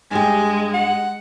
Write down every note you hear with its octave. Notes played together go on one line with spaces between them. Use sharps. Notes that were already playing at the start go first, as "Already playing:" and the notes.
G2 G#3 G4 G#5
F#5